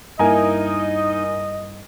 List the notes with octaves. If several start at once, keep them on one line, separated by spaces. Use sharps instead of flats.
G2 A#3 D#4 E4 A#4 D#5 G#5 A#5